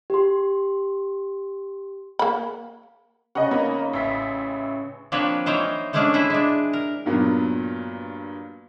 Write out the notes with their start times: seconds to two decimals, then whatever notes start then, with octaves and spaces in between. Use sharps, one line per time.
0.10 G4 C6
2.19 A#3 B5
3.35 C#3 D#5 F#5
3.51 A#3 D#4 B4
3.93 A1 E5 B6
5.12 F3 A#3 C4 D4 B4 C#5
5.46 E3 D#4 C5 C#5 F5 G5
5.93 E3 G#3 A3 C#4 D4 G#4
6.14 E4 G#4 C5 E5
6.30 G#3 D4
6.73 A#4
7.06 G2 A#2 F#3 B3